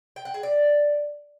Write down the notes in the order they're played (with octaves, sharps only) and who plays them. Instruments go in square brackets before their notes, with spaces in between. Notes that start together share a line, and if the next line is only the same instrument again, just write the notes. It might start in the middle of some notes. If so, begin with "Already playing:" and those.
[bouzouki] G5
F#5
G#4
D5